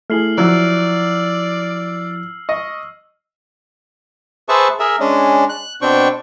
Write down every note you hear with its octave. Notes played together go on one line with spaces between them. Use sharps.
A3 E4 G#4 F6 C7 F#7
F3 F#3 E4 D5 E6
D#5 C#6
G#4 B4 C5 E5 A5 C#6
G#4 A#4 E5
G#3 C#4 D4
F#6
B2 C4 D4 G5 C#6